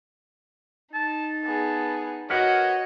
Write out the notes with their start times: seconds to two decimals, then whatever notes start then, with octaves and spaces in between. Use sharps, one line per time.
0.94 D#4 A5
1.44 B3 G#4 A5
2.30 F#4 A#4 B4 C#5 D#5 F#5